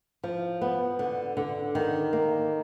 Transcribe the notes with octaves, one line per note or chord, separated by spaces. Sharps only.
F3
B3
D3
D3
D#3
A#3